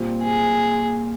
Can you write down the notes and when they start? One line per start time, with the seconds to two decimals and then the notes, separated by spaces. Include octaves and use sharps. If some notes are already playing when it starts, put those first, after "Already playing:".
Already playing: A#2 G3 C4 F4
0.23 G#4